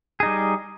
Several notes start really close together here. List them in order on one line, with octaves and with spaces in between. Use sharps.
G#4 D#4 G3